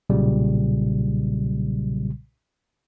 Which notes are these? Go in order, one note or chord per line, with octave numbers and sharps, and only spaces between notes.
B1 A#2 C#3 F#3 G3